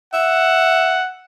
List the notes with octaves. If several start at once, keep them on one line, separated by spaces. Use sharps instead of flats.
E5 F#5